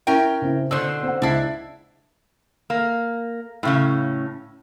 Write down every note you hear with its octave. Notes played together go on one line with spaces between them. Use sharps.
C#4 E4 A#4 G5
C#3 C4 E4
B2 D3 C5 E6
C4 F#5
C#2 D4 E4 A5 C7
A#3
A2 C#3 C#4